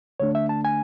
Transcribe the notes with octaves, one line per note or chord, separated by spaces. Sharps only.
D2 D3 A3 D4 C#5
E5
A5
G#5